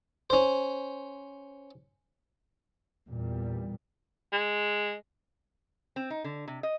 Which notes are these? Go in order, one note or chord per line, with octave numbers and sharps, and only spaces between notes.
C#4 C5
E2 A#2 G3
G#3
C4
D#4
D3
C3
D#5